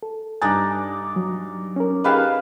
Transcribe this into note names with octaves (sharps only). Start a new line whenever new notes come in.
A4
G2 D4 D#4 D5 G#5 A#5 A6
F#3
C#4 A#4
D#4 G4 G#4 B4 F5 A5